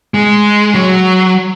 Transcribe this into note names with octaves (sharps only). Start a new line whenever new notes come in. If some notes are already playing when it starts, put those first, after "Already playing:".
G#3
F#3